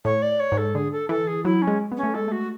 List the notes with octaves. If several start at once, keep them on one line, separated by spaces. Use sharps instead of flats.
A2 C#5
D5
C#5
G#2
A4
D3 G#4
A4
E3 A4
G#4
F#3 E4
C#4
G#3
B3
C#4
A3
G#3 A4
A3 F#4